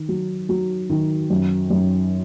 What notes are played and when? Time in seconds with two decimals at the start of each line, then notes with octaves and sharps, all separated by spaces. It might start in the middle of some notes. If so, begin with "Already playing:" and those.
Already playing: D#3
0.09 F#3
0.49 F#3
0.90 D#3
1.30 F#2
1.71 F#2